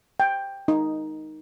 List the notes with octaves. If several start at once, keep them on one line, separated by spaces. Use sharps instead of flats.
G5
D#4